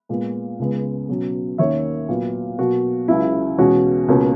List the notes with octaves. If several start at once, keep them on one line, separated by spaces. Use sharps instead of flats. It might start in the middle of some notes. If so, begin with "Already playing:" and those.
A#2 G#3 B3
C#2 C#3 G#3 B3
B2 F#3 C#4
D#2 D#3 A#3 C#4 C#5 E5
A#2 F#3 B3
B2 F#3 A#3 F#4
C#2 C#3 F#3 E4
E2 B2 G#3 C#4 F#4
C#2 B2 A#3 C#4